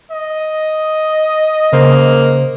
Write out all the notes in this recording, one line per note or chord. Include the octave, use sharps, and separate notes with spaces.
D#5
C#3 A#3 C5